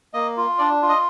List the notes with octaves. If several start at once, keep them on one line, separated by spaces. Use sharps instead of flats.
A#3 D#5
F4
D4 D5
F4
D#5